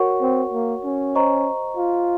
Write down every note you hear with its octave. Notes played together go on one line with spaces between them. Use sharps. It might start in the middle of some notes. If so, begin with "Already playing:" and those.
Already playing: F#4 A#4 C#5 F#5 C#6
C4
A#3
C#4
C5 D#5 A#5 C#6
F4